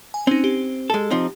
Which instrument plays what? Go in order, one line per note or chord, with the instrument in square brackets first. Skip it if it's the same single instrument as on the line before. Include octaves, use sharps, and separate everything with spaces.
[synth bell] G#5
[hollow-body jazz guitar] C4 [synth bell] C#4 D#4
[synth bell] G4
[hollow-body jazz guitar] G#3 A4
F3 C4 D#4